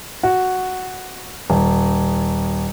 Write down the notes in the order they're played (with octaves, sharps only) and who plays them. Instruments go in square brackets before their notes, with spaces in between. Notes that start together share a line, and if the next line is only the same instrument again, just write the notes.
[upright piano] F#4
D#1